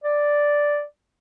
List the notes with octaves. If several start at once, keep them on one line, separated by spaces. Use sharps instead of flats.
D5